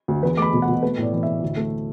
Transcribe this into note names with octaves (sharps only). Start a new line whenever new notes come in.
D2
E2 B4
A3 B5 D6
B2
F#5
B2
A3 B4
A2
D5
E3
A2 E5
D2
A3